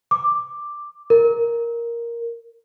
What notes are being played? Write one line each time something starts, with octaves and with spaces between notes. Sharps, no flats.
D6
A#4